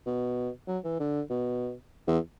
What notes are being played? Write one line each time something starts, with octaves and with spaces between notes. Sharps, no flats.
B2
F#3
E3
D3
B2
E2